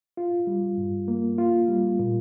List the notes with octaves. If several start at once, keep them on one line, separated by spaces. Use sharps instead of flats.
F4
G3
G2
A#3
F4
G3
A#2